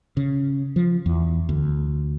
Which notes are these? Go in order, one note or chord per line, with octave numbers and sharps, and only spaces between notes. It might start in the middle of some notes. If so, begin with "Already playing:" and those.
C#3
F3
E2
D2